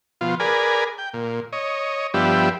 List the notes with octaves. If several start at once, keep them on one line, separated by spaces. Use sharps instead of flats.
B2 F3 F4
G#4 A#4 B4 D5 G#5
G5
A#2
C#5 D#5
G2 F3 B3 D4 G4 E5